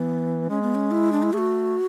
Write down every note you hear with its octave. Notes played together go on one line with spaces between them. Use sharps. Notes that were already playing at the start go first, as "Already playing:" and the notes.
Already playing: E3 B3
G#3 C#4
B3
C#4
E4
D4
E4
A3 G#4
F#4